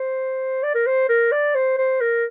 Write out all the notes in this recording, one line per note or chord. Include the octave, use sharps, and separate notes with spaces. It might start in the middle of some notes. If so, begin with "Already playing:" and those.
Already playing: C5
D5
A#4
C5
A#4
D5
C5
C5
A#4